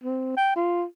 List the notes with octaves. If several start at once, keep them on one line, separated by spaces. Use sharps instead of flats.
C4
G5
F4